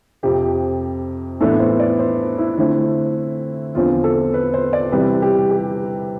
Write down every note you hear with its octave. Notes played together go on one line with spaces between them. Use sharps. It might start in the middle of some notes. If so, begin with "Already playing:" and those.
F2 C3 F3 G4
A2 E3 B3 D4 A4
C5
D5
C5
E4
D3 A3 C4 E4
E2 D3 F3 C4 F4
A4
B4
C5
D5
C3 E3 G3 B4
G4
G4